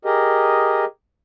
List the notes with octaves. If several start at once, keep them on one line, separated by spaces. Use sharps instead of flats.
G4 G#4 A#4 D#5